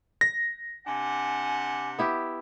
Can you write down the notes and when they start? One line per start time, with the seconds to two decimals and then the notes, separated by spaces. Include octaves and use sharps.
0.21 A#6
0.86 C3 D4 F#5 G#5
1.99 B3 E4 G4